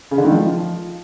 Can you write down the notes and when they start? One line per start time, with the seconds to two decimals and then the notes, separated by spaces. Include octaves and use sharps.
0.11 C#3
0.18 D3
0.25 D#3
0.32 F3